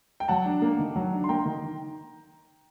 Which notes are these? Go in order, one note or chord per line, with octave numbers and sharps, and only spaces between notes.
G5
F#3 F#5 A5
D4
A#3
D#3
F#3
D4
C6
A#3 G5 A#5
D#3